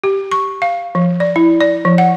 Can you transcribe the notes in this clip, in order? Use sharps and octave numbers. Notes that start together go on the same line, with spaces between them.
G4
C#6
F5
F3
D5
E4
D5
F3
F#5